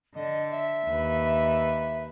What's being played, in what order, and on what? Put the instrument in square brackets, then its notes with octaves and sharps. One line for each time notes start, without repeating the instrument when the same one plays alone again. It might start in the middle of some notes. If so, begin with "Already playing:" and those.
[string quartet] D3 [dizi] D#5
[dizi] E5
[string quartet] D#2 B4